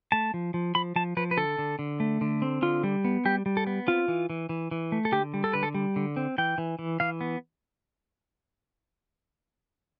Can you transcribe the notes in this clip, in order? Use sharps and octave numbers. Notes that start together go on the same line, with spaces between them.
A3 A5
F3
F3
F3 B5
F3 A5
F3 B4
B4
D3 A4
D3
D3
A3
D3
C4
D3 F4
G3
B3
G3 G4
G3
A4
B3
C4 F4
E3
E3
E3
E3
A3
A4
D3 G4
G3
A4
D3 B4
A4
G3
D3
C4
E3 G5
E3
E3
E3 F5
B3